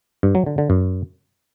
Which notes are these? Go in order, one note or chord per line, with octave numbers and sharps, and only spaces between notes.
G2
F#3
D3
D3
F#2